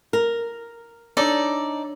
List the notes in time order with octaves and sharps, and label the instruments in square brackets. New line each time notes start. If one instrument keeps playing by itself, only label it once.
[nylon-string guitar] A#4
[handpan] D4 C#5 [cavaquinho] D#4 A4 D5